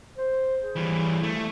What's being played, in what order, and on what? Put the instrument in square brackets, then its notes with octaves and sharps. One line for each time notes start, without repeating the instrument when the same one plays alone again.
[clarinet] C5
G#4
[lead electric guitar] E3 G3
A3